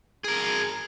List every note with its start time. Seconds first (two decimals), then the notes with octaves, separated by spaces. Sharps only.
0.24 G#4 A#4